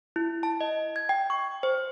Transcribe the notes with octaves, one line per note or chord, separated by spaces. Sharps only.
E4
A5
D#5
G#6
G5
C#6
C5